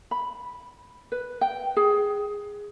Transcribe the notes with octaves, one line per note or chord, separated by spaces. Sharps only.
B5
B4
G5
G#4